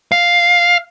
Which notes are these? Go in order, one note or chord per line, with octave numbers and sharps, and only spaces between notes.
F5